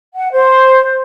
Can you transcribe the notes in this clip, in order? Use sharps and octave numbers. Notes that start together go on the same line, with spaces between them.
F#5
C5